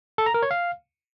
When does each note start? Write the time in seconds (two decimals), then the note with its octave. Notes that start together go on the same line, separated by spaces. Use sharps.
0.18 A4
0.26 A#5
0.34 A#4
0.43 C#5
0.51 F5